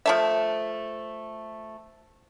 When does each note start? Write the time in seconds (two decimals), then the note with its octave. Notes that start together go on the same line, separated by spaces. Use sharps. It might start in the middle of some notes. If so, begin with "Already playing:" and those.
0.06 F3 A3 E5